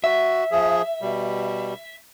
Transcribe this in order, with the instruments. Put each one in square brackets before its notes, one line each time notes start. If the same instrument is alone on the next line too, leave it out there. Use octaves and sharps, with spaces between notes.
[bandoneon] F#4 [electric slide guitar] E5
[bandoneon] F3 G#4
B2 G3